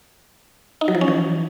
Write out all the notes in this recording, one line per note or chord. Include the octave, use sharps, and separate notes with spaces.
D#4
F#3
F3
C#4
E3